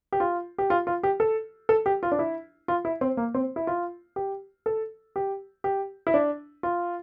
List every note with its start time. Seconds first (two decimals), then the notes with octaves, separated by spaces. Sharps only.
0.12 G4
0.20 F4
0.58 G4
0.70 F4
0.87 F4
1.03 G4
1.20 A4
1.69 A4
1.86 G4
2.03 F4
2.12 D4
2.19 E4
2.68 F4
2.85 E4
3.01 C4
3.17 A#3
3.34 C4
3.56 E4
3.67 F4
4.16 G4
4.66 A4
5.16 G4
5.64 G4
6.07 E4
6.14 D4
6.63 F4